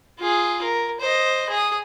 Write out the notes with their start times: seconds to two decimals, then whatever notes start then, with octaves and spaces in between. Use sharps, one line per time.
0.20 F4 G#4
0.63 A#4
1.00 C5 D#5
1.50 G#4 D#6